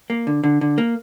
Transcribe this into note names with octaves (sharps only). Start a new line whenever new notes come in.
A#3
D3
D3
D3
A#3